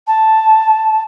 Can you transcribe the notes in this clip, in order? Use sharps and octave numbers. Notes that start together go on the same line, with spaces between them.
A5